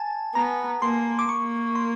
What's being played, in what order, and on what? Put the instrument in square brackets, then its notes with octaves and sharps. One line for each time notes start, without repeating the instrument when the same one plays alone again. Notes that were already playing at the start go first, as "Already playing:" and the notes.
Already playing: [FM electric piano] G#5 A5
[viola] B3 [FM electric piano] A#5
[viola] A#3 [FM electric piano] C6
[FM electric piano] D6
[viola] A#3 [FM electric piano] C#6
[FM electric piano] C6